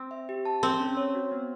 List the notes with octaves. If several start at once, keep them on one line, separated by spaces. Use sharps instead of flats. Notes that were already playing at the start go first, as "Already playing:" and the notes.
Already playing: C4
E5
G4
A5
C4 G#4
C#4
C#5
F#4
B3